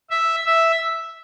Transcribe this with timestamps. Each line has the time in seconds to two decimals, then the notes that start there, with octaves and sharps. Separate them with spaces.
0.10 E5
0.46 E5